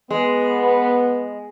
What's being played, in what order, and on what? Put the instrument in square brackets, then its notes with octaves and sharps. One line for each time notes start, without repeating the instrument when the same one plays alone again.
[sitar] G#3 [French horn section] B3